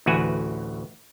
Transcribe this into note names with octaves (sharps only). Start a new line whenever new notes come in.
A1 D2 E3 F#4 B4 G#5